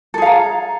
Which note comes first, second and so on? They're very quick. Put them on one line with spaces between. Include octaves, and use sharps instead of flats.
A4 G#4 F5 A#5